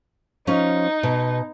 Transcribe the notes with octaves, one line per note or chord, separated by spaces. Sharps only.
F3 C#4 D#4 C#5
B2